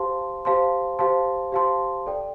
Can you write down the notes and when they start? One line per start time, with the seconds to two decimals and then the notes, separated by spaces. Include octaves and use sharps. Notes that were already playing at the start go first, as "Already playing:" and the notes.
Already playing: G4 C5 F5 A5 C6
0.45 G4 C5 F5 A5 C6
0.99 G4 C5 F5 A5 C6
1.52 G4 C5 F5 A5 C6
2.07 A4 D5 G5